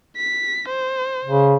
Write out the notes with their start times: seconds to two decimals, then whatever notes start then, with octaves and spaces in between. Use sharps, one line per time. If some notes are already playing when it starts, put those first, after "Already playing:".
0.17 B6
0.68 C5
1.25 C#3